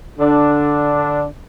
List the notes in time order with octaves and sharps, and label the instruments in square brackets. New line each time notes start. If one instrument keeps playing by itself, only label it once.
[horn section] D3 D4